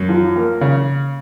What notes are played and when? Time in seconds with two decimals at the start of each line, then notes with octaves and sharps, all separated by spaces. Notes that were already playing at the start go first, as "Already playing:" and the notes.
Already playing: F#2
0.09 F3
0.36 A#3
0.61 C#3